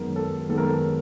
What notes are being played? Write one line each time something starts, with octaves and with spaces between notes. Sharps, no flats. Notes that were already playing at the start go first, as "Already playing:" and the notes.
Already playing: F#2 D#3 G#3 B3 A#4
A4
F#2 D#3 G#3 B3 A4
A#4
A4